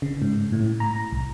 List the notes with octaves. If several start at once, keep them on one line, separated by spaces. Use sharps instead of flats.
C#3
G#2
A2
A#5
C2